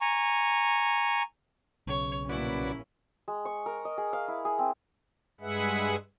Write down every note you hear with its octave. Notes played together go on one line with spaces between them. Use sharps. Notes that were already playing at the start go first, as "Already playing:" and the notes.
G#5 A#5 C#6
B1 C#3 C#5
A#1 A#3 C#4 E4 F#4 B4 D5
G#3
C#6
A#4
D#5
G#4
F5
E4
G#4
C4
G2 G#3 G#4 B4 E5 F#5